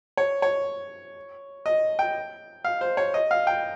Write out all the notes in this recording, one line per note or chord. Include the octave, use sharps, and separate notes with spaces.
C#5
C#5
D#5
G5
F5
C5
C#5
D#5
F5
G5